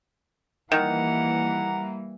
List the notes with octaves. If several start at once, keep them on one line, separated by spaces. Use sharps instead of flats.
D#3 E3 G3 A#3 F#5 A#5